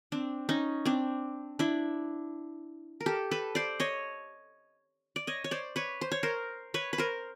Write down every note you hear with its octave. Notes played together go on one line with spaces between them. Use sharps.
C4 D4
C#4 D#4
C4 D4
D4 E4
A#4
G4 A4
A4 B4
C5 D5
C#5 D#5
D5
C#5 D#5
C#5
C5 D5
B4 C#5
C5
C#5
A#4 C5
B4 C#5
B4
A#4 C5